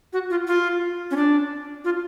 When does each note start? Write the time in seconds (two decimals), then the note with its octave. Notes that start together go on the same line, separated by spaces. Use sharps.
0.13 F#4
0.30 F4
0.47 F4
1.11 C#4
1.16 D4
1.85 F4